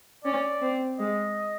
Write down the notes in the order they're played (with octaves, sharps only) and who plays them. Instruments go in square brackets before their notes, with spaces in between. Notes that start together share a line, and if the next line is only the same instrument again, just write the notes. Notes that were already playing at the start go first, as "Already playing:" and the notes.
[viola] C#4 [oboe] D5
[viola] C4
[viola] G#3 [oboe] D#5